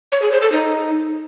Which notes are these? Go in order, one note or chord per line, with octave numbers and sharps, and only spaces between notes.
C#5
G#4
C5
A4
D#4